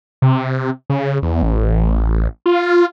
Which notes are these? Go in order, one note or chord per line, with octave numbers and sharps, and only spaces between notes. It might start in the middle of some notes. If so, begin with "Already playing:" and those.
C3
C#3
E2
A1
F4